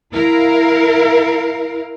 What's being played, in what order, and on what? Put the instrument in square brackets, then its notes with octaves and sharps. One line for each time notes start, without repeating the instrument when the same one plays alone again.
[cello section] E4 A#4 F5